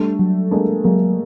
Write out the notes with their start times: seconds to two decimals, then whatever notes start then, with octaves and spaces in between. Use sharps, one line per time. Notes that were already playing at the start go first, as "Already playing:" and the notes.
Already playing: G3 A3 D4
0.19 F#3
0.51 G#3 A#3 D4
0.84 F#3 G#3 A#3